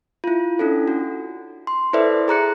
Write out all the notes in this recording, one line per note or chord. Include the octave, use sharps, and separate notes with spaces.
E4 F4
C#4 D4 E4 A4
F#4
C6
E4 A4 B4 C5 D5 E5
G#4 A#5 F#6 C#7